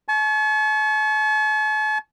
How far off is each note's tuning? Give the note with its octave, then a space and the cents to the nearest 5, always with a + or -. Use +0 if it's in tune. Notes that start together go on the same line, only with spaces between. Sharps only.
A5 -45 C#6 -5